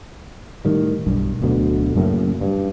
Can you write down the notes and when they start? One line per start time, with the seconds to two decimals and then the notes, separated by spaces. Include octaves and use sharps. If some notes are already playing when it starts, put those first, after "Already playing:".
0.65 A2 D#3 G3
1.07 B1 G2
1.42 D1 D2 B2 D3
1.95 F#2 A2 C#3 A#3
2.41 G2